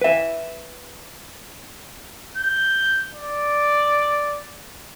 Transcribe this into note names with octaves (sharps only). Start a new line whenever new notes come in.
B4 E5
G6
D5